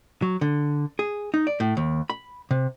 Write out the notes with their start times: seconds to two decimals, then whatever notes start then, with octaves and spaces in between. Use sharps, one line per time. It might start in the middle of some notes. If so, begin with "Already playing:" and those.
0.22 F#3
0.41 D3
0.99 G#4
1.34 D#4
1.47 D5
1.60 A2
1.77 D#2
2.10 B5
2.51 C3